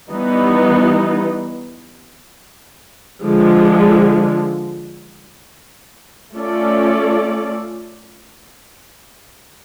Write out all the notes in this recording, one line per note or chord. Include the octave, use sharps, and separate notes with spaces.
E3 G3 B3 D#4
D3 F3 G#3
A3 C#4 F4 A4 D5